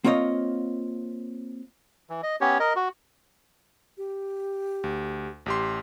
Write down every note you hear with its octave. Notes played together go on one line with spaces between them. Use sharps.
A#3 C4 F4 C#5 D#5
E3
D#5
B3 C#4 G4 C#5
A#4 D#5
F#4
G4
D2
A1 G4 C6